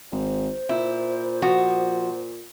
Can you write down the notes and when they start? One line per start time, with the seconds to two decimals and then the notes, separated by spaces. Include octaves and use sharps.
0.12 G#1 C5
0.69 A#2 E4
1.42 F3 F#4